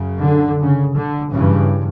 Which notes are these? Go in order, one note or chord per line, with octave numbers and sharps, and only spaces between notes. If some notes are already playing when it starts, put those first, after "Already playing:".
Already playing: F#2 C#3
D3
C#3
D3
G2 C#3 E3